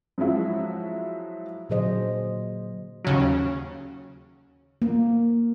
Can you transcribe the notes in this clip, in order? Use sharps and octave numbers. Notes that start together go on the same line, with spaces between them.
F3 F#3 G#3 E4 F#4
A#2 D3 F#3 G#4 C5 D#5
D#2 C#3 F#3
A#3